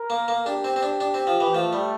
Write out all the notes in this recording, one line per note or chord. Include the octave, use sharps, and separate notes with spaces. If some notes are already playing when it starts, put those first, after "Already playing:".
Already playing: A#4
A#3
A#3
D4 G4
C4
C4
D4
D4
C4
F3
E3
F3 A3
G3